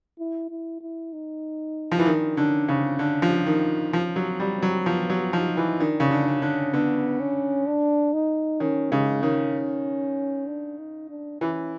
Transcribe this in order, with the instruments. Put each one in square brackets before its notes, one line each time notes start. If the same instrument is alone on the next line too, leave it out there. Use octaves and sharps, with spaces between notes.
[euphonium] E4
E4
E4
D#4
[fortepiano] F3
E3
[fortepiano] D#3 [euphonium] D4
[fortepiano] D3 [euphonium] C#4
[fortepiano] C#3 [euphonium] C4
[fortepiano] D3 [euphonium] C#4
[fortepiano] F3
[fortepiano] D#3 [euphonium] D#4
[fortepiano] F3 [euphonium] C#4
[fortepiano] F#3
[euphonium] C4
[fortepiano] G3
[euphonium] C4
[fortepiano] F#3
[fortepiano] F3 [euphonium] B3
[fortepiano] F#3
[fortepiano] F3 [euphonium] D#4
[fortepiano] E3
[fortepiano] D#3 [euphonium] D4
[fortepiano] C#3
D3
[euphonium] C#4
[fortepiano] D3
[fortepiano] D3 [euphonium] B3
[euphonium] C#4
D4
D#4
[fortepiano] D#3 [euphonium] C#4
[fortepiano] C#3 [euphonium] G#3
[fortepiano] D#3 [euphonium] C#4
[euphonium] D4
D#4
D4
[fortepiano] E3 [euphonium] C#4